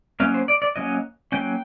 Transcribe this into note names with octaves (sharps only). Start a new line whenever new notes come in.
F#3 A#3 C#4 F5
C5
D5
D5
F#3 A#3 C#4 D#5
F#3 A#3 C#4 G5